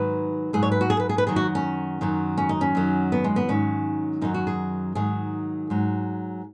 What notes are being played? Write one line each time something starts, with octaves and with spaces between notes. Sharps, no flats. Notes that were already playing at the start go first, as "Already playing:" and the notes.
Already playing: G#2 D#3 F#3 B4
G#2 F#3 G#4
C#5
B4
F#4
G#4
B4
G#4
B4
F#2 D#3 F#3 G#4
F#4
C#4
F#2 D#3 F#3
C#4
D#4
C#4
F#2 D#3 F#3
B3
G#3
B3
G#2 D#3 F#3 C#4
F#2 D#3 F#3 D#4
F#4
G#4
G#2 D#3 F#3 G#4
G#2 F#3